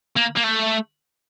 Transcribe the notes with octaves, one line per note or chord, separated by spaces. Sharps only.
A#3
A#3
A3